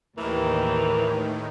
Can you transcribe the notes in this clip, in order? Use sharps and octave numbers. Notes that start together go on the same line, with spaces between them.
D#2 A2 D#3 E3 G4 A#4